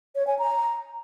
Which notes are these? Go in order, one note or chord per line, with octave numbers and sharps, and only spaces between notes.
C#5
G#5
A#5